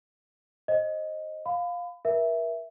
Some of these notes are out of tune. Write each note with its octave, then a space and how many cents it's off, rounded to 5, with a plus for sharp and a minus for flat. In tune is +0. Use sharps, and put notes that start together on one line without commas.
C5 +20 D#5 +0
F5 +10 B5 +30
A#4 +40 E5 +0